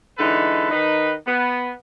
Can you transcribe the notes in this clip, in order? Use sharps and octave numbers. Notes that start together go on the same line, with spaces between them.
D3 E3 G#3 D#4 A4 B4
D#3 D#4 B4
B3